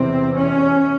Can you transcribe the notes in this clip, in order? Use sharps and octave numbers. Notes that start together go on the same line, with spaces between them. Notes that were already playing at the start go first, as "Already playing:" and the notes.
Already playing: E2 C3 C4
C#4